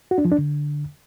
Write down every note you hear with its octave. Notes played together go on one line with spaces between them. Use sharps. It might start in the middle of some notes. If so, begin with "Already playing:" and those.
F#4
D4
F3
D4
D3